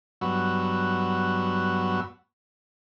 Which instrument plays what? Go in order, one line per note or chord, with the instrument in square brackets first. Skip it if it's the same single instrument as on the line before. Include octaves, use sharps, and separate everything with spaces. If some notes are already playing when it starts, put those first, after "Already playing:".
[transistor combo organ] G2 F#3 B3 F#4 E6